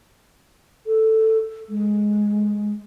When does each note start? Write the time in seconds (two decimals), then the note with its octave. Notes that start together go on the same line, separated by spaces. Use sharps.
0.87 A4
1.69 G#3